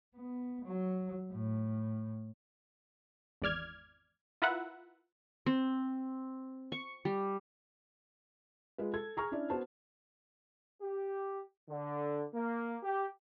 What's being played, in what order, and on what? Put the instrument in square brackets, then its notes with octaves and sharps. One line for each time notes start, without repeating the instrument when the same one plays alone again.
[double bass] B3
F#3
A2
[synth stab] G#1 E2 D5 F6 G#6
E4 F4 A#4 B4 E5 F#5
[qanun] C4
C#6
G3
[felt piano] G#3 F4 B4
A4 G#6
G#4 A#5 C#6 F6
C#4 D4 E4 D5
B3 F#4 C5 A5
[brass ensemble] G4
D3
A#3
G4